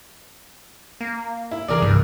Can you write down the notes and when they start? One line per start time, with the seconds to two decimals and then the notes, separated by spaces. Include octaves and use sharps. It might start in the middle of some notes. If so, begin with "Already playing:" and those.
1.00 A#3
1.51 E4
1.68 D3 E3 G#4 A#4 D5
1.82 C2 G2